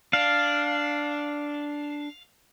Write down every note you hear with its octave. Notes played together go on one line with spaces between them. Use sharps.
D4 F5